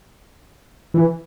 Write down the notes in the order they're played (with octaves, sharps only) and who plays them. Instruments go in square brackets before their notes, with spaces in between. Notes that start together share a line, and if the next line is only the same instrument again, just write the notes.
[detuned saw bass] E3